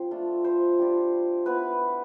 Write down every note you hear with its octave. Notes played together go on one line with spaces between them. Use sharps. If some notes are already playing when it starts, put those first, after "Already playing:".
Already playing: F3 C4 C5
A3 D4 F4
C5
G3 D4 F4
B3 E4 B4